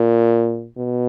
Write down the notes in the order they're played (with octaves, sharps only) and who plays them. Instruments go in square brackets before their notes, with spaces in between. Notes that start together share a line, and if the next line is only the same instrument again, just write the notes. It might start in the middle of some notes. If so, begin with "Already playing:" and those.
Already playing: [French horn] A#2
B2